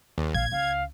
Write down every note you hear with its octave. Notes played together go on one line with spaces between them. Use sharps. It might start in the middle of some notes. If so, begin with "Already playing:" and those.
D#2
A#1 A#2 F5 G#6
C#2 F5